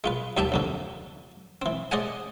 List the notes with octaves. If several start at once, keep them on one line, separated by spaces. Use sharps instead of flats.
G#3 F4 B4
D#2 G3 G4 E5 G5 A5
A#1 F2 D3
E3 C4
G#4 C5 D5 D#5 F#5 G#5